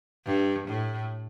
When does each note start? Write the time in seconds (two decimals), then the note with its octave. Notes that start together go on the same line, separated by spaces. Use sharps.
0.26 G2
0.68 A2